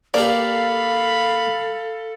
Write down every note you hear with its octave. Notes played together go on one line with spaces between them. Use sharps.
A#3 D4 G4 A4 D5 F5 B5